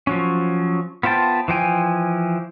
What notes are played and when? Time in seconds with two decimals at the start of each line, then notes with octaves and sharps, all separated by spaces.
0.07 F3 F#3 C#4
1.03 B3 F4 C5 G5 A5
1.48 E3 F3 G5 G#5